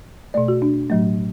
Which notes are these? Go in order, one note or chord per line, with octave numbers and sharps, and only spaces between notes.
B2 A3 D5
F#4
D4
A2 F#3 A3